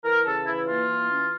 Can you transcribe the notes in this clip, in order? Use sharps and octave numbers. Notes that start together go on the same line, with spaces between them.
E3 A#4
C#3 A4
E3 E4
A#3 F4
E3
C#4